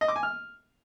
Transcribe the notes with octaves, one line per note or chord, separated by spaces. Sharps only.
D#5
D6
G#5
F6